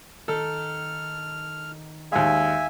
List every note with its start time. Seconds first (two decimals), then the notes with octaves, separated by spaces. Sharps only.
0.28 D#3 A4 F6
2.12 D#2 G#3 E5 F5 G#5